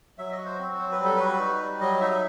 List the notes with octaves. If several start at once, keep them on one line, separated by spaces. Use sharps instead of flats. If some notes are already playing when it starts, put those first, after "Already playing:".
F#3 E5
D#5
F#4
C5
C4
F#3 C5
B4
G3
A4
F#4 B4
D#4
G3
F#3 D#5
D#4 E5
E5